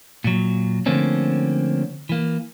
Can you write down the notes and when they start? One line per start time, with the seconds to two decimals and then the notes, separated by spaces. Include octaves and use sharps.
0.24 A#2 F#3
0.86 D3 F3 A3 A#3 C4 C#4
2.09 E3 A#3